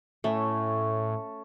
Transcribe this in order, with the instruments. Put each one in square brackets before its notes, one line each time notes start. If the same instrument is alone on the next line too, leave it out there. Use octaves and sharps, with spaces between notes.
[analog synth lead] A2 [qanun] A3 [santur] C#4 A4 C#5